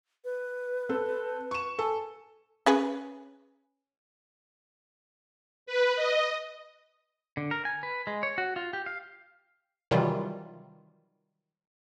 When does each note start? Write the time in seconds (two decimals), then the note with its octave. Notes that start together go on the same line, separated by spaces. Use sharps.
0.25 B4
0.89 C4 A4
1.51 C#6 E7
1.79 A4 G#5
2.66 C#4 G#4 B4
5.66 B4
5.96 D#5
7.37 D3
7.51 A#4
7.65 G#5
7.83 B4
8.07 G#3
8.23 C#5
8.38 F#4
8.56 F4
8.73 G4
8.86 F5
9.91 C3 D#3 E3 F#3 G3 F4